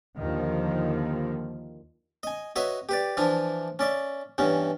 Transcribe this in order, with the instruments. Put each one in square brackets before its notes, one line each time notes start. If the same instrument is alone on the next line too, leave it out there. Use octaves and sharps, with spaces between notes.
[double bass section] D#2 D3 D#3 F3
[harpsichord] D#5 G#5
F#4 B4 C#5 D#5 E5
G4 B4 D5
E3 F3 D4 E4
C#4 D5 E5
G2 E3 B3 C#4